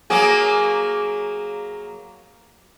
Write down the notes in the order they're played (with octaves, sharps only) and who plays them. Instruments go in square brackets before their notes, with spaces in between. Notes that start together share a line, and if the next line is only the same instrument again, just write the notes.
[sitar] F#3 A#3 G#4